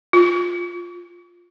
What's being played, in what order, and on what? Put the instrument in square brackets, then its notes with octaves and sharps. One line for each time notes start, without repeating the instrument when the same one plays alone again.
[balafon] F4